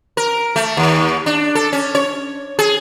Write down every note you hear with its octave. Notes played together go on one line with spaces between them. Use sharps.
A#4
A3
D#2
D4
A4
C#4
C#5
G#4